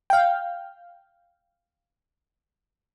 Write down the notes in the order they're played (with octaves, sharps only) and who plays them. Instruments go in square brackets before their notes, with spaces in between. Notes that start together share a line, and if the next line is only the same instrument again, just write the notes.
[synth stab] F5 G5